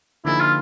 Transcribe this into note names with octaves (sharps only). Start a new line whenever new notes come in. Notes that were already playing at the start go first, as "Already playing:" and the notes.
D3 F3 A#3 D#4 E4 G#4
F4